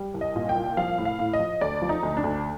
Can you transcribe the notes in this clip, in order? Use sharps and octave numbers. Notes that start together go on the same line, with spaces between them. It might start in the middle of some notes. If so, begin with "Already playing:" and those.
Already playing: G3
C2
D#5
A#2
G5
C2
F3 F5
A2
F5
A2
D#5
F3
D2 D5
F3
D#4
D2
D4
D2